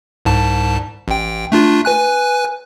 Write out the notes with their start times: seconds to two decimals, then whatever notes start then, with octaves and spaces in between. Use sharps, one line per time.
0.25 C2 G#2 A5
1.08 A1 G5
1.52 A3 D4 F4
1.85 B4 G#5 F#6